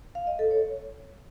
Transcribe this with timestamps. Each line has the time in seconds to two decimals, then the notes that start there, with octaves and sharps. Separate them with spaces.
0.15 F5
0.27 D#5
0.39 A4
0.51 C#5